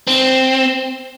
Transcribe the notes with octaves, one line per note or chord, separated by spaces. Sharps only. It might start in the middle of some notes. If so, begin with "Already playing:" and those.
C4